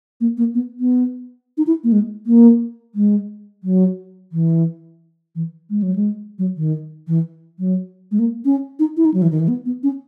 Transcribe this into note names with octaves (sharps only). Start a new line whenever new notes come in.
A#3
A#3
B3
B3
D#4
E4
A#3
G#3
A#3
G#3
F#3
E3
E3
G#3
F#3
G#3
F#3
D#3
E3
F#3
G#3
A#3
C#4
D#4
E4
D#4
F#3
E3
D#3
E3
B3
B3
C#4